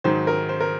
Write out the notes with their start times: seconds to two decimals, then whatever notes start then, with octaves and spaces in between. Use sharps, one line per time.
0.04 G#2 D#3 F#3 C5
0.27 A#4
0.49 C5
0.60 A#4